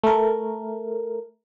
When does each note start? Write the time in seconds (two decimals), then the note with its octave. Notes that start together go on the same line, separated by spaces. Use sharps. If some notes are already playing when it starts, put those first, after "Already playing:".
0.03 A3 A#4